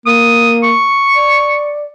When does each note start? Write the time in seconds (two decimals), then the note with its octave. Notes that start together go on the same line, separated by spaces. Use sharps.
0.06 A#3 D#6
0.63 C#6
1.16 D5